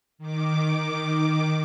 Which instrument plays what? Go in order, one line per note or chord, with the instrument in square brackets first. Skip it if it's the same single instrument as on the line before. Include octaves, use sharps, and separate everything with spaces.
[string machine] D#3 D6